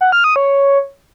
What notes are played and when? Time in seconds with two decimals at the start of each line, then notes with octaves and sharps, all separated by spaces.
0.01 F#5
0.12 F6
0.24 D#6
0.36 C#5